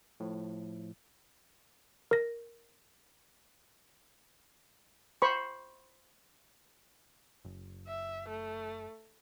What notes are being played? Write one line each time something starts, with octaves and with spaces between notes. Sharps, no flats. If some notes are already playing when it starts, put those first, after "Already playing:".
A2 F3
A#4 A#6
C5 B5 C#6
F#1
E5
A3